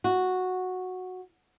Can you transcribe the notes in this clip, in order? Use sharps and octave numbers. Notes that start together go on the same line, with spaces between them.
F#4